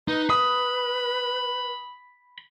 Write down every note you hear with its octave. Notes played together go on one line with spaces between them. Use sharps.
D#4 B4
B5 D#6